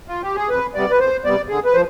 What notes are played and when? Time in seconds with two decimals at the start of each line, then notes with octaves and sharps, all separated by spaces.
0.08 F4
0.22 G4
0.35 G#4
0.49 F2 B4
0.74 C3 G3 B3 D5
0.90 B4
0.99 F2 C5
1.24 C3 G3 B3 D5
1.48 D3 G#4
1.65 B4
1.73 F3 C5